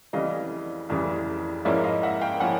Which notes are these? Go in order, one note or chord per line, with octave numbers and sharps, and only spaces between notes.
F1 F2 C#3 E3 G3 D#5 F5
F1 F2 C#3 E3 G3
G#2 F3 A#3 C#4 E4 D5 E5
D#5 F5
E5 F#5
F5 G5
F3 A#3 C#4 E4 F#5 G#5